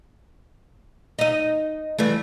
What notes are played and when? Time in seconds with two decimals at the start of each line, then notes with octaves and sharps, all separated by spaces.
1.19 D#4 D#5
1.98 E3 G3 A3